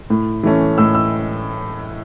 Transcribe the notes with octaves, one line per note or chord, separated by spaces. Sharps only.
A2
E3 A3 C#4
A2 E6
E6